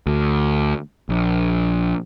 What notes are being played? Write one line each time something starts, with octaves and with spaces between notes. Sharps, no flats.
D2
A#1